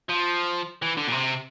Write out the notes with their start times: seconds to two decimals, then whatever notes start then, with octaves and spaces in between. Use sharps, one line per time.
0.09 F3
0.82 E3
0.97 D3
1.07 A#2
1.12 C3